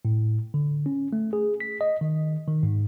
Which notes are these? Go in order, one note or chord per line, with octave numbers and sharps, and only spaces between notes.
A2
D3
C#4
A3
G#4
B6
D#5
D#3
D#3
G#2